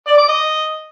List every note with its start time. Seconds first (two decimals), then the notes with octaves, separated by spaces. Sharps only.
0.07 D5
0.18 D6
0.29 D#5